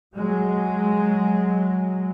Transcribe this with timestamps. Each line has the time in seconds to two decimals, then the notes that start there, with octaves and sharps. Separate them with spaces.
0.16 F#3 G#3